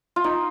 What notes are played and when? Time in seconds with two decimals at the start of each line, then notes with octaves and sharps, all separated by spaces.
0.16 F4
0.24 D#4